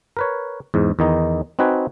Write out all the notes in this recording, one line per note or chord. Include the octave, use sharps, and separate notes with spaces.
A#4 B4 C#5
E2 G#2
E2 D#3 D#4
C4 D#4 F#4 B4 G#5